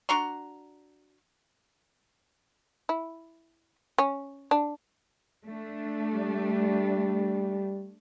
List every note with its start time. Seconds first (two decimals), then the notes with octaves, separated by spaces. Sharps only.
0.09 D4 F#4 A#5 C6
2.89 E4
3.98 C#4
4.51 D4
5.45 A3 D4
6.12 G3